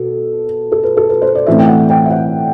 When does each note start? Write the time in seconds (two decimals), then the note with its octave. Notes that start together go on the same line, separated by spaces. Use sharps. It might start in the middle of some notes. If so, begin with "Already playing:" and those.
Already playing: B2 A4
0.72 A4
0.83 B4
0.97 A4
1.09 B4
1.22 C5
1.35 D5
1.46 A2 E3 A3 C4 E5
1.59 G5
1.68 F#5
1.90 G5
2.05 E5
2.10 F#5